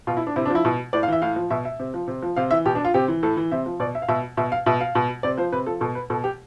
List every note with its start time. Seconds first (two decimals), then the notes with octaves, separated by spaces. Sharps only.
0.07 B2 F4
0.17 E4
0.27 D4
0.36 C3 E4
0.45 D4
0.50 F3 E4
0.65 B2
0.93 A2 D5
1.03 F5
1.08 E3 E5
1.22 A2 F5
1.36 F3
1.50 B2 E5
1.65 E5
1.80 C3
1.94 F3
2.08 C3
2.22 F3
2.37 C3 F5
2.51 E3 E5
2.65 B2 G4
2.75 D4
2.85 F4
2.94 C3 G4
3.08 E3
3.23 A2 A4
3.37 E3
3.52 C3 E5
3.66 F3
3.80 B2 D5
3.95 E5
4.02 F5
4.08 B2 E5
4.37 B2 E5
4.52 F5
4.66 B2 E5
4.81 F5
4.95 B2
5.23 C3 D5
5.38 F3 C5
5.52 C3 B4
5.66 F3 A4
5.81 B2 A4
5.95 B4
6.10 B2 A4
6.24 G4